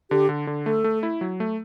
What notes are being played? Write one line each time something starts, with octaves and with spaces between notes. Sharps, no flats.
D3 G4
D3
D3
A3 A4
A3
E4
F#3
A3